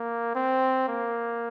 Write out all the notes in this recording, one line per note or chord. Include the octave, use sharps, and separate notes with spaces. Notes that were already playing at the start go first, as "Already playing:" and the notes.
Already playing: A#3
C4
A#3